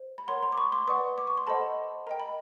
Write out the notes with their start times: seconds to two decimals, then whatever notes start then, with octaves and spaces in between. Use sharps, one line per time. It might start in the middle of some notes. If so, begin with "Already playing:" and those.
Already playing: C5
0.18 B5
0.28 A#4 C#5 F#5 A#5 C6
0.43 A#5 C6
0.52 D6
0.57 B5 C#6
0.72 C6 D6
0.87 B4 D5 F#5 C#6 D#6
1.18 D6
1.27 C#6
1.38 C6
1.47 A4 C5 D#5 F#5 A5 B5
2.07 A#4 D#5 G5 A#5
2.20 B5